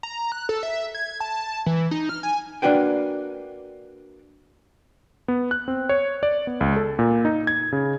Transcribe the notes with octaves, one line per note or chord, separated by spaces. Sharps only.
A#5
F#6
A4
E5
G#6
A5
E3
D#4
F6
G#5
A#3 D4 F#4 B4 G5
B3
F#6
C4
C#5
D5
B3
C#2
A4
A#2
D#4
G#6
C#3